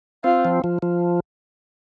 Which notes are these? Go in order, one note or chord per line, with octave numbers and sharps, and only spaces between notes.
C4 F4
F3
F3
F3